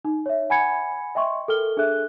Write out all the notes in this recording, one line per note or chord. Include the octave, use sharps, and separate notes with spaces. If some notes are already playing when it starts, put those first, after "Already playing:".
D#4
C#5 E5
F#5 G#5 B5 G#6 C#7
D#5 E5 G5 C6 C#6
A4 A#4 G5 F6 G7
D4 G#4 A4 E5 F#6